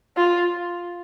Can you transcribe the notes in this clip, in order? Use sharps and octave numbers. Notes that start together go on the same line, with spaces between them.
F4